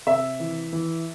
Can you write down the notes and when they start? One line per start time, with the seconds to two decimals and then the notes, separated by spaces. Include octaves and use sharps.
0.06 C3 E5
0.40 E3
0.72 E3